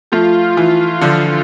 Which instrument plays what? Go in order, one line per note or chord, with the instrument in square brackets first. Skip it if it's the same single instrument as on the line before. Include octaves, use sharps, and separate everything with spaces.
[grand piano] F3 A3 [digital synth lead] F4
[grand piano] E3
D3 F3